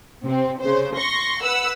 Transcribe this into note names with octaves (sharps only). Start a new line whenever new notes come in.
C3 C4
C#3 C5
C6 C#6 A#6
B4 F#5 E6